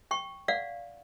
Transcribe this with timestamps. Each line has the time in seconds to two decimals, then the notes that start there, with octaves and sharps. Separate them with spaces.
0.11 G5 C#6
0.48 D5 F5 F#5